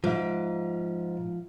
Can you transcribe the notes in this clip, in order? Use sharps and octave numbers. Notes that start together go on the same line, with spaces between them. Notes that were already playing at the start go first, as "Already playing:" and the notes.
G#2 F3 F4 E5